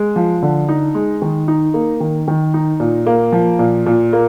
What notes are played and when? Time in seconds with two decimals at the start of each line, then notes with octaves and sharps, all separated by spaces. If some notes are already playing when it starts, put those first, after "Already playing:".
Already playing: G#3
0.16 F3
0.42 D3
0.69 D#4
0.95 G#3
1.22 D#3
1.48 D#4
1.74 A#3
2.00 D#3
2.28 D#3
2.54 D#4
2.80 A#2
3.06 A#3
3.32 F3
3.59 A#2
3.86 A#2
4.13 A#3